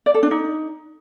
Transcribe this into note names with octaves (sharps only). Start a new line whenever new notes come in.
D5
A4
D4
D#4